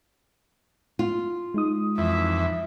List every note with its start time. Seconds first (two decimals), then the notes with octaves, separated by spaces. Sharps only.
0.99 F4
1.54 G#3 D#4 D#6
1.98 F2 E3 E5